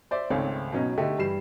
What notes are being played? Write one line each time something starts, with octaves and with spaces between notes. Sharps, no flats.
C5 D5 E5
G#1 C#2 A3 C4 C#5 F5
B2 F#3 C#4 D#4
D3 A3 G4 D#5
G2 E3 G3 C7 E7